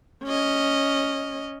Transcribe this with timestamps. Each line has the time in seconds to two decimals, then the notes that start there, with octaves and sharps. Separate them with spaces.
0.24 C#4 D#5